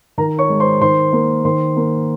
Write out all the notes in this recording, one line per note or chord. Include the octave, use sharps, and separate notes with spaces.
D#3 A#4 A#5
C#5 C#6
G#3
C5 C6
D#3 C5 C6
A#3
D#3 C5 C6
A#3